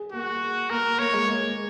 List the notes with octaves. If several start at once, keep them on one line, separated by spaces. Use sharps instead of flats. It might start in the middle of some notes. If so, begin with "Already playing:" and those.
Already playing: G#4
A#3 F#4
A#3 A#4
A#3 C#5
G#3
A#3